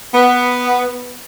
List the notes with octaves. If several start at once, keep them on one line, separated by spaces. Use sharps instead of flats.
B3